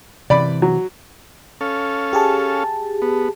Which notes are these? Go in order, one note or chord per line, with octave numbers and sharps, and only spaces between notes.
C3 E3 D5 B5
F#3
C#4 A4 F5
G4 G#4 A5
B3